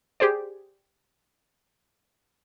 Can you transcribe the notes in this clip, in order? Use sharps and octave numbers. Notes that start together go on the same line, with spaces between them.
G4 G#4 C5 D5